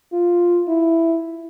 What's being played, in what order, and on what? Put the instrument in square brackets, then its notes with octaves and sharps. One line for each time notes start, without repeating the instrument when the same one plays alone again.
[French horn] F4
E4